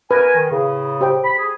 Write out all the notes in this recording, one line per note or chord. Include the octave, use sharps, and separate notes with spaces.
A#4 B4 G#5
D#3
A2 C#3
G4 C5 G5
B5
G#4